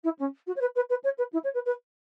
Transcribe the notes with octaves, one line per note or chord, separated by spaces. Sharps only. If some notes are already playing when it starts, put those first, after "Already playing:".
E4
C#4
F#4
C#5
B4
B4
B4
C#5
B4
E4
C#5
B4
B4